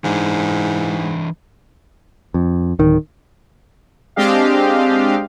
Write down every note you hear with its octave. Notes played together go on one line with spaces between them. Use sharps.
G#2 E3 D4 E4
F2
D1 D#3
G#3 C4 D4 G4 D#5 F5